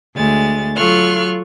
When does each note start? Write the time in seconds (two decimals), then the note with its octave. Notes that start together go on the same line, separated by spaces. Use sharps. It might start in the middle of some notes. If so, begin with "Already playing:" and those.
0.14 D2 G#3 A6
0.76 F#3 F4 A4 C#6 F6 F#6